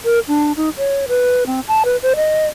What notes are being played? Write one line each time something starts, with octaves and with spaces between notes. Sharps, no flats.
A#4
D4
D#4
C#5
B4
C4
A5
B4
C5
D#5